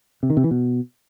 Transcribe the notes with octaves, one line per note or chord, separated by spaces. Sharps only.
C3
D#3
C3
E3
B2